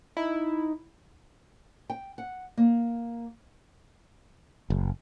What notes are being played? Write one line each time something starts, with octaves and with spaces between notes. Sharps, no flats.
D#4 E4
G5
F#5
A#3
F#1